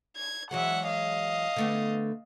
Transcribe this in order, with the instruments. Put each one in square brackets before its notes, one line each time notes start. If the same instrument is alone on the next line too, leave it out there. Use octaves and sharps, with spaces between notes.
[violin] G#6
[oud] E3 F#3 G#3 [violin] E5 F#5
[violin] D#5 F5
[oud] D3 A3 B3